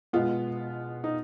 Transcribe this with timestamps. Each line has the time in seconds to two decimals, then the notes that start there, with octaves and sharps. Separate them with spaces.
0.13 B2 G#3 B3 F4
1.04 D#4